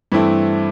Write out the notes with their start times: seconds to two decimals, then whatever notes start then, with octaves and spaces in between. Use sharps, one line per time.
0.12 G2 E3 A3 C4 E4